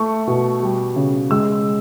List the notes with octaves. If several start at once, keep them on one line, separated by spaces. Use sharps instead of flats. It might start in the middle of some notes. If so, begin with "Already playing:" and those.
Already playing: A3 C#6
B2
G3
C#3
G#3 E6